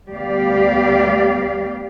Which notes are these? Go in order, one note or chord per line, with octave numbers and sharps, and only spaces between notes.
D2 G3 B3 G4 D5 F5